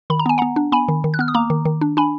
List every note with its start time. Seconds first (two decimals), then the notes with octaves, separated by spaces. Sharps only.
0.10 D#3 B5
0.19 A#5
0.26 B3 G#5
0.38 B3 F#5 A#5
0.56 D4
0.72 B3 G#5 B5
0.88 D#3
1.04 D#3
1.14 F#6
1.19 B3 F6
1.28 D#6
1.34 A#3 A#5 D6
1.50 D#3
1.65 D#3
1.81 D4
1.97 D4 G#5 B5